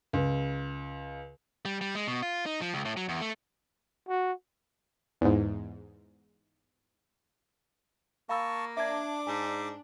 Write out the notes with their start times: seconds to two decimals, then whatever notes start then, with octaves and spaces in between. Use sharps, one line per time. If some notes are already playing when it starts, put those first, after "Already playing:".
0.13 C#2
1.65 G3
1.81 G3
1.95 G#3
2.07 B2
2.22 F4
2.46 D#4
2.61 F3
2.74 C#2
2.85 A2
2.97 F#3
3.09 E2
3.21 A3
4.09 F#4
5.21 E2 G#2
8.29 A#3 F5 A5 B5 C#6 E6
8.77 D4 E5 D6 G#6
9.27 G#2 G#5 B6